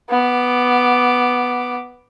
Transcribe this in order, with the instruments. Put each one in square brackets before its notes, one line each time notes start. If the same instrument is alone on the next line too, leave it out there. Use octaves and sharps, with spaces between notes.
[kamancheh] B3 D6